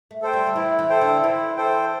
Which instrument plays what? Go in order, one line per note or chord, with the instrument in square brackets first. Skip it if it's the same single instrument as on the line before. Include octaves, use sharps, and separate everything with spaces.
[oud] A3
[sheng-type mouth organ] A4 C5 G5
[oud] G3
D3
[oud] E3 [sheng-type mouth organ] E4
[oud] E3
[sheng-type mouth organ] A4 C5 G5
[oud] D3
[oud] E3 [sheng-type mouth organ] E4
[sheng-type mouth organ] A4 C5 G5